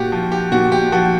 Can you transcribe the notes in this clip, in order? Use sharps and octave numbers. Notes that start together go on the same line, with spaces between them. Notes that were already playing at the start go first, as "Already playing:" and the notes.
Already playing: A#2 F#4 G4
F3
G4
A#2 F#4
G4
F3 F#4